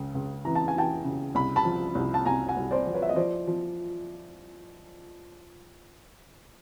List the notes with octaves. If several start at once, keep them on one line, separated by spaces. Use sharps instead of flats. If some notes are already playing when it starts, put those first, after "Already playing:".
Already playing: C#2 C#3
C#2
E3 A#5
A5
G#5
E3 G5 A5
C#3
C2 B5
A5 B5
F3
C2
A5
C2 G#5 A#5
F#5 G#5
C2
C5 D5
F3
B4 C#5
E5
D#5
F3 C5 D5
F3